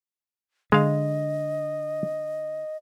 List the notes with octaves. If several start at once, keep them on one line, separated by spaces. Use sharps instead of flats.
D3 G#3 D#5 F5